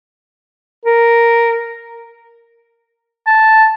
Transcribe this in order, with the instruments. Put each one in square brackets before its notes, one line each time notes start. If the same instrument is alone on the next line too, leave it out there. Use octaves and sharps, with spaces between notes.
[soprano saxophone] A#4
[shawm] A5